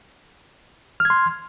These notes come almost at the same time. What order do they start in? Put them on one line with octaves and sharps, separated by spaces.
F6 G#6 C6